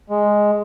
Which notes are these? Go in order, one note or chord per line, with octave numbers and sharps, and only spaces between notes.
G#3